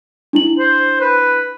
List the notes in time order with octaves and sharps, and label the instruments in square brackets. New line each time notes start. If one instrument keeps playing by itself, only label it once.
[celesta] D4 E4 F#7
[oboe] C5
B4